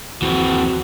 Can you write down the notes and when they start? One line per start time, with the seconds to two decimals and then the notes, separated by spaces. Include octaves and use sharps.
0.22 D#2 E3 F3 C4 F#4